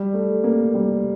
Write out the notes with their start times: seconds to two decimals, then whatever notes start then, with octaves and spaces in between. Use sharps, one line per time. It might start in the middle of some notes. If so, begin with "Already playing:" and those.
Already playing: G3
0.14 A3
0.44 A#3
0.74 G3